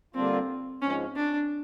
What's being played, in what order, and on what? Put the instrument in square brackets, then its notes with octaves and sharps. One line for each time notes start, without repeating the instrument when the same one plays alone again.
[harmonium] D3 G3 A#3 D4 F4 [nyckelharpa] C4
[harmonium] G#2 F3 G#3 [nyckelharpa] C#4
[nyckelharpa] D4